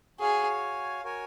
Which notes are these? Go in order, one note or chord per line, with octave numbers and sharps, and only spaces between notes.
F#4 G#4 C#5 F5 G#5
F#4 A#4 C#5 G#5